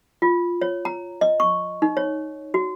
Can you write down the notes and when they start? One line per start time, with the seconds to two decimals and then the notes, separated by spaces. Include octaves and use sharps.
0.22 F4
0.62 C#5
0.85 A#5
1.21 D#5
1.40 C#6
1.82 D#4
1.97 C#5
2.54 F#4